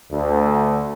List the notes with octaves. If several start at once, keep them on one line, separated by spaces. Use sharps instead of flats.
D2